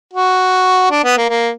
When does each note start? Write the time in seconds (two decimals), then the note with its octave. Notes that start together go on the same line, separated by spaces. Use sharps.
0.13 F#4
0.91 D4
1.04 B3
1.17 A#3
1.29 A#3